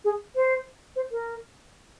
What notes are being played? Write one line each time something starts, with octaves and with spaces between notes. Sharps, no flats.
G#4
C5
C5
A#4